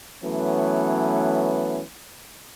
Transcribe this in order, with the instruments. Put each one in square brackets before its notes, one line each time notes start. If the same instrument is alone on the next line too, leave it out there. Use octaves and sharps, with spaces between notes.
[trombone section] E3 F#3 A3 B3 C#4